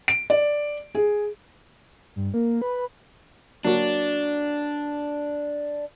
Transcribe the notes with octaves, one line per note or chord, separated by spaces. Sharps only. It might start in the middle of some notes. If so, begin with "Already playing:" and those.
D7
D5
G#4
G2
A#3
B4
F#3 A#3 D4 F#4